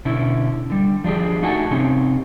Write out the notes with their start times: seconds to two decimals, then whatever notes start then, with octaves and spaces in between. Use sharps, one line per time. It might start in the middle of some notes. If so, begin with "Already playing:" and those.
0.05 B2 D3 C#4 E4
0.70 D3 G3
1.04 F3 D4 G4 G#4
1.42 A3 D#4 F#4 F#5 G#5 A5
1.71 C3 C4 C#4 D#4 G4